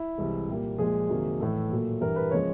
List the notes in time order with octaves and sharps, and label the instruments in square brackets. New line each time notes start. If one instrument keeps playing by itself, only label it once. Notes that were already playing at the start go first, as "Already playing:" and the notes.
Already playing: [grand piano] E4
C2 C3 E3 G#3
A#2 G3 A#3
A#2 F3 G#3 G#4
F2 C3 D#3 F#3 A#3
A2 E3 G#3 A4
A#2 F#3 A#3
G2 E3 G3 A#4
B4
C#3 F3 G#3 C#5